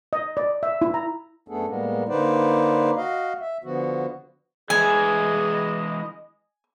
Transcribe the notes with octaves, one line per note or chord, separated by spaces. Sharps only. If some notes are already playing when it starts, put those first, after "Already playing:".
D#5
D5
E5
E4
A#5
F#2 A3 B3 D4 G#4 A4
A2 G3 G#3 A#3 B3
D3 A#3 D#4 B4 C5 D5
F#4 D#5 F5
E5
D3 F3 B3 F#4
E3 G#3 E4 G#4 D#5 G#5